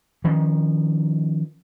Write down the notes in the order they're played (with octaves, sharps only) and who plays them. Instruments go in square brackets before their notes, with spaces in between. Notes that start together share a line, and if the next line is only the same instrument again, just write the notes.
[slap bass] D#3 F3 C#4